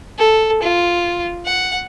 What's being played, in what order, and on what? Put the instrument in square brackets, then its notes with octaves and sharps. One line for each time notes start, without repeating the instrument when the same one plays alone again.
[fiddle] A4
F4
F#5